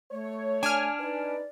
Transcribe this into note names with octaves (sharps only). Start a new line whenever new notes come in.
A3 C#5
D4 G#5 F6
D#4 B4 D5